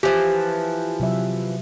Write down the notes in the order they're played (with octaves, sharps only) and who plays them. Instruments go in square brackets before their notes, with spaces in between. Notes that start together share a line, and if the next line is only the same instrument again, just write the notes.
[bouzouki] E3 F3 [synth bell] G4
[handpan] C3 F#3 E5